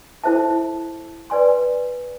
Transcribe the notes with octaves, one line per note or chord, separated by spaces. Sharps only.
E4 A4 C5 E5 A5
B4 D5 G#5 C6